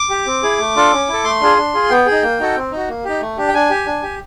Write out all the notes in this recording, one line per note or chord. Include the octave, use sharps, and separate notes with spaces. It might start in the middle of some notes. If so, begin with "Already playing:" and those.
Already playing: D6
G4
C4
E4 G#4
A3
D4 F4 A4
C#4
E4 A4
A3 C6
D4 F4 G#4
D4
F4 G#4
B3 G5
D#4 G#4
A#3
D#4 F#4 A4
C4
D#4 F#4
A#3
D#4 G4
A3
D4 G4
G5
D4 G#5
G4
D4
G4